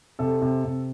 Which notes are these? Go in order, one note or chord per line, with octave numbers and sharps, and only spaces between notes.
C3 A4
C3
C3